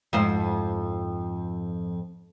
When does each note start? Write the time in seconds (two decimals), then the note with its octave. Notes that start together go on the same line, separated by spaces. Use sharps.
0.13 F2 G#2 C5